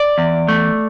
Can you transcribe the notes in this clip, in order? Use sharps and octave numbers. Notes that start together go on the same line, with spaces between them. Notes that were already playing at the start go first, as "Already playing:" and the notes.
Already playing: D5
E2
A3